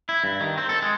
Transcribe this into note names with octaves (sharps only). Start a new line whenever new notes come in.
E4
G2
D#3
C4
A4
G#3